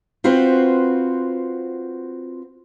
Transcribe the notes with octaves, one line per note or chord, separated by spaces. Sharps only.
C4 F4 F#4 B4 C5